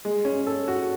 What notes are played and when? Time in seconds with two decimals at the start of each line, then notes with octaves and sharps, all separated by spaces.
0.05 G#3
0.25 C#4
0.46 A4
0.68 F#4